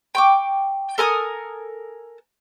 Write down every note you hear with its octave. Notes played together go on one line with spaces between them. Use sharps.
G5 C#6 D6
A4 A#4 G#5 D#6